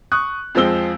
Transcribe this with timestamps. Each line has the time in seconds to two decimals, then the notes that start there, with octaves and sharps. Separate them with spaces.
0.12 C#6 D#6 F#6
0.55 F2 F3 G#3 C4 E6 G7